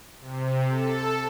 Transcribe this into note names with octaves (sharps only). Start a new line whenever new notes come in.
C3
A4